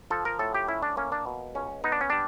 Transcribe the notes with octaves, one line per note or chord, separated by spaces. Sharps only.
F3 A4
A#4
A2 A4
G4
C#4 E4
D4
A#3 C#4
D4
B2
C#2 C#4
B3 D#4
D4
C#4
G3 D4